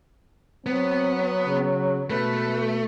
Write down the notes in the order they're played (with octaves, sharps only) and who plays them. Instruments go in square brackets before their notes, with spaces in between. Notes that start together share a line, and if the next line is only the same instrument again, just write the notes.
[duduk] F#3 [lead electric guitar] B3 [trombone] C4
[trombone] C#3
[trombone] B2 [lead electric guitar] A3 [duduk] B4